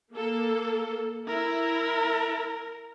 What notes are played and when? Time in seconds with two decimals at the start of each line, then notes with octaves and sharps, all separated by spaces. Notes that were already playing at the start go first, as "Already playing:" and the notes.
0.13 A#3 A4
1.28 E4 A#4